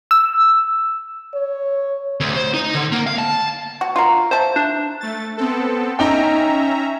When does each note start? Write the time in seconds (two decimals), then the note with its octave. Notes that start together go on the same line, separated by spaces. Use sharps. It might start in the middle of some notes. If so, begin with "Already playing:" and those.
0.11 E6
1.34 C#5
2.20 D2
2.36 C5
2.54 D#4
2.74 D3
2.92 A#3
3.07 F5
3.18 A5
3.81 F#4
3.96 F4 F#4 A#4
4.31 C5 E5 A5
4.56 D4
5.00 A3 A6
5.37 B3 C4 A4
5.99 C#4 D#4 E5 G5 A#5